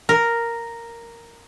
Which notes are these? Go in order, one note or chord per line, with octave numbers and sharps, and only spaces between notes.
A#4